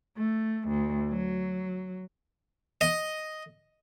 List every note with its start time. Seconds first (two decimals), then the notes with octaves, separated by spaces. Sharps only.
0.17 A3
0.68 D2
1.10 F#3
2.81 D#5